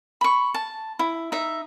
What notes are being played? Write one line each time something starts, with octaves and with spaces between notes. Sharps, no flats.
B5 C#6
A5
E4
D#4 E5